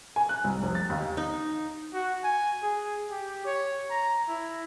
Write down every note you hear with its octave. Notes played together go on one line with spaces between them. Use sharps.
G#5
F#6
C2
F1
A6
D#2
D#4
F#4
G#5
G#4
G4
C#5
A#5
E4